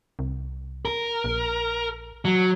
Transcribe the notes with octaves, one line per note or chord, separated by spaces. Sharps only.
C2
A#4
A#1
F#3